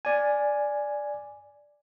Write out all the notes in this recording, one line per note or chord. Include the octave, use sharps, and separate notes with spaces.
D5 G#5